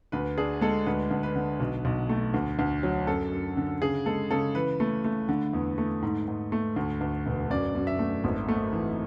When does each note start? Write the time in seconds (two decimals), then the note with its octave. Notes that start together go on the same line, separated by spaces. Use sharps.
0.12 D2 B4
0.38 D4 G#4
0.61 G#3 A4
0.86 D2 B4
1.11 D2
1.23 B4
1.36 D3
1.60 B1
1.85 B1
2.09 A3
2.34 D2
2.59 D2
2.83 F#3
3.07 F#2 A4
3.32 F#2
3.57 D3
3.81 C#3 G#4
4.06 G#3 A4
4.31 C#3 A4
4.55 E3 B4
4.80 A3
5.05 A3
5.29 D3
5.53 E2
5.78 A3
6.02 G#2
6.28 G#2
6.52 A3
6.76 D2
7.01 D2
7.26 E1
7.50 F#2 D5
7.75 F#2
7.87 E5
7.99 A3
8.24 G#1
8.49 A3
8.73 E3